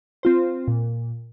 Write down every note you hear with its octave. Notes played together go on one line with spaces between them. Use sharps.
C4 F4 C5
A#2